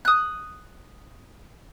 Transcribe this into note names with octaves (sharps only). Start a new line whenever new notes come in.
D#6 F#6